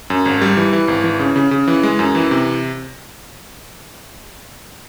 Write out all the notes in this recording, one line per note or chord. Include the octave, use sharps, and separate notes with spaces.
F#2
G#1
G3
E3
E3
G#1
E3
C#3
C#3
C#3
E3
G#3
F#2
E3
C3